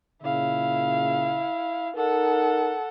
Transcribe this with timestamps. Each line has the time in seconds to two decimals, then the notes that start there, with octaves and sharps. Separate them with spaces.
0.23 A#2 C#3 E4 F5
1.96 D#4 A4 A#4 F#5